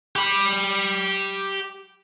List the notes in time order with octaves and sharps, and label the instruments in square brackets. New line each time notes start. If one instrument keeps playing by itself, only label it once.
[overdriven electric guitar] G4 B5